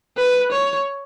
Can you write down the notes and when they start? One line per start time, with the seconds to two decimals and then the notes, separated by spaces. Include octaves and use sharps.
0.17 B4
0.52 C#5